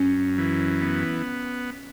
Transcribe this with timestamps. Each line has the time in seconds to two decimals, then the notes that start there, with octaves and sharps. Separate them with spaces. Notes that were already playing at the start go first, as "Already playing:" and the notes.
Already playing: F#2 C#4
0.38 E3
0.82 B3